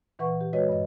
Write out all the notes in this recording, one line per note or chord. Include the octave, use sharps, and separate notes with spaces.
A#2 E3 B4 F#5 C#6
G4
G#3 F#4 B4 C#5 D#5
G2 D#5